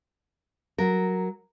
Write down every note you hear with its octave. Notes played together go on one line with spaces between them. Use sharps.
F#3 A#4